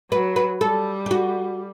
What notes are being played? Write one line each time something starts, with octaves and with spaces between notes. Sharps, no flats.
F#3 B4
B4
G3 A4
G4
F#4